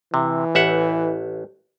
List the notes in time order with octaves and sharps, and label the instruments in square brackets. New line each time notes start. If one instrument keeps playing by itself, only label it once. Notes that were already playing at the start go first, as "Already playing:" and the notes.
[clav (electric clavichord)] C3 [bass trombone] E3
[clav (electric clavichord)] A1 E5 F#5